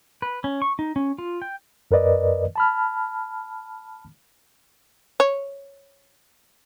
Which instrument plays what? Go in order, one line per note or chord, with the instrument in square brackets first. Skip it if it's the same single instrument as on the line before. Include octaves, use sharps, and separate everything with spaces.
[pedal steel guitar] B4
C#4
C#6
D#4
C#4
F4
G5
[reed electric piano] F#2 A#4 B4 D5 D#5
A5 B5 F6
[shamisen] C#5